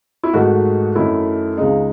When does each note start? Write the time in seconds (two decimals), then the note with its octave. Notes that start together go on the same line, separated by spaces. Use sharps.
0.23 E4
0.33 G#2 D#3 A3 F#4
0.95 F#2 D#3 A3 E4
1.57 C#2 C#3 G#3 D#4